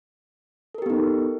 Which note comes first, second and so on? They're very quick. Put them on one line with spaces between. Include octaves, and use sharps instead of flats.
A4 A#4 G4 B3 D#4